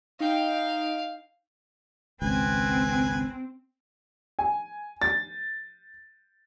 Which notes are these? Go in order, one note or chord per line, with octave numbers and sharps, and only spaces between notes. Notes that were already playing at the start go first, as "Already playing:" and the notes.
D#4 F5 G5
G#1 C#2 C4 B4 G#5
G#5
A6